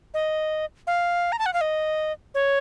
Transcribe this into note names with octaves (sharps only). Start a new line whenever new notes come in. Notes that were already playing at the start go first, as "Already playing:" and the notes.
D#5
F5
A#5
A5
F#5
F5
D#5
C#5